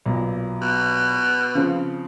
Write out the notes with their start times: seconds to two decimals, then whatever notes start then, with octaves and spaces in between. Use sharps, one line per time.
0.06 B1 A#2
0.62 B2
1.55 C#3 F3 C4